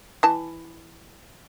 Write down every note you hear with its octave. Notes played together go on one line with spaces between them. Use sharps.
E3 A5